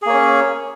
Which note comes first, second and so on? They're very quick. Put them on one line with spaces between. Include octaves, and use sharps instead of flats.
G#4 A#3 C#5 C#4